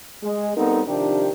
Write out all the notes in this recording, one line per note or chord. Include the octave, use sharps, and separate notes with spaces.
G#3
G3 B3 C4 D#4 A4 A#4
C3 D#3 F3 D4 G4